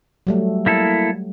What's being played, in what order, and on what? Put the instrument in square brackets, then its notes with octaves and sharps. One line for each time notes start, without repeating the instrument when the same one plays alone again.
[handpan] F#3 G3 A3
[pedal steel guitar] A#3 E4 A4